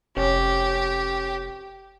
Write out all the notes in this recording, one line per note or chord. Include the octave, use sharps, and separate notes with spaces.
F1 C#4 G4